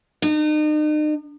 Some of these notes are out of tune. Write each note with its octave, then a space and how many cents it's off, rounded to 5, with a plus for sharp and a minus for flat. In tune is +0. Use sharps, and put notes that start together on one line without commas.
D#4 -40